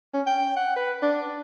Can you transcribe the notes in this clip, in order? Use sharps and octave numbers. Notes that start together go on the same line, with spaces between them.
C#4
G5
F#5
B4
D4